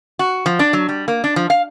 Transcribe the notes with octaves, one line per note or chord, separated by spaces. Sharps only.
F#4
F3
D4
F#3
G3
A#3
D4
F3
F5